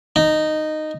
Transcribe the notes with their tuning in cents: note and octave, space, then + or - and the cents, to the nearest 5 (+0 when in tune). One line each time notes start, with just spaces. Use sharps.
D#4 -10